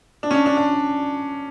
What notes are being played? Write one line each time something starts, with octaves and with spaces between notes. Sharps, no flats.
D4
C#4
D4
D4
D4